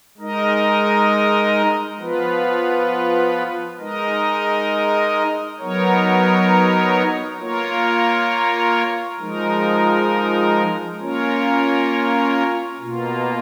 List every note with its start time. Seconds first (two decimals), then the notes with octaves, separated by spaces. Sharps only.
0.18 G#3 D#4 A#4 D#5
1.99 F3 B3 F4 B4
3.79 G#3 D#4 A#4 D#5
5.59 F#3 B3 D#4 A#4 C#5
7.39 A#3 F4 A#4 C#5
9.20 F3 G#3 D#4 A#4
10.99 A#3 C#4 F4 A#4 C#5
12.80 B2 A#3 F4